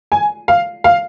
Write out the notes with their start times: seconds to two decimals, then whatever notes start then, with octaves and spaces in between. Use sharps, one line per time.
0.12 G#5
0.48 F5
0.84 F5